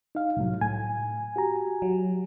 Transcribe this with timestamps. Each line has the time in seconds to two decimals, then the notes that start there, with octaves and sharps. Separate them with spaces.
0.15 D#4 F5
0.37 C2 A2 F#3
0.61 A2 G#5
1.36 F#4 G4 A#5
1.82 F#3